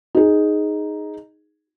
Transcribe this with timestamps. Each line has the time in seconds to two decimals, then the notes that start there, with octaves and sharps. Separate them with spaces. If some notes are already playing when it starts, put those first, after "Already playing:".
0.15 D#4 G#4